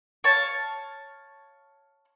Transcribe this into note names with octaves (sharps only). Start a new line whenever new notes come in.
C#5 F5 A5